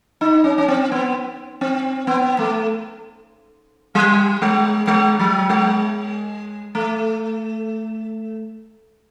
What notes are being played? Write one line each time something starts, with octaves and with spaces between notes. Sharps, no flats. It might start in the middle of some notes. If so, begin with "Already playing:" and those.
D#4
C#4
C#4
C4
B3
C4
B3
A3
G3
G#3
G#3
F#3
G#3
A3